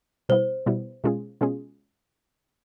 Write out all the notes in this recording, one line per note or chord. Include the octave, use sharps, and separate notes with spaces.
B2 G3 B3 E4 C5
B2 G3 B3 E4
B2 G#3 C#4 F4 G#4
B2 G#3 C#4 F4 G#4